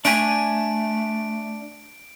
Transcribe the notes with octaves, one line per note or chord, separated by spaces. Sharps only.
A3 D4 G#5 D7